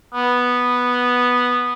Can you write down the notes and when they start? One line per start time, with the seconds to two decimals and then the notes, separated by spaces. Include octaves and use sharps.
0.14 B3